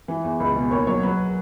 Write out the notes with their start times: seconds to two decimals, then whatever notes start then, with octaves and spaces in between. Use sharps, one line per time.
0.08 E3
0.24 E2
0.40 C#2
0.56 B2
0.71 D#2 C#5
0.87 F#3 C#5
1.03 F#3 B4